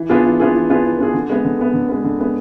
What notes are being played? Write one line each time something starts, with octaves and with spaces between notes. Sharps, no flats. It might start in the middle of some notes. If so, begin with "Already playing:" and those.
Already playing: E3
B3 D4 F4 G#4
E3
B3 D4 F4 G#4
E3
B3 D4 F4 G#4
E3
B3 D4 F4 G#4
D3
G#3 B3
D3
G#3 B3
D3
G#3 B3
D3
G#3 B3